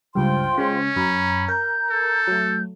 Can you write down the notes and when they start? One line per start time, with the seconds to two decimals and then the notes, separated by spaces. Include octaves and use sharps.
0.15 C#2 G2 F4 C5 G5 C6
0.58 C#3 G#3 C#4
0.96 F#2 A#5 B5
1.48 A#4 G6
1.90 A4
2.27 F#3 A3